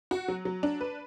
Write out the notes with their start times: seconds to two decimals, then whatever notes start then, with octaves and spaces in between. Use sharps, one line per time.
0.11 F#4
0.28 F#3
0.45 F#3
0.63 D4
0.81 B4